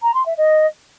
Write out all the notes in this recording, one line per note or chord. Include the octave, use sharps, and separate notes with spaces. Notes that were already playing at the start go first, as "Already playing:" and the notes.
A#5
C6
E5
D#5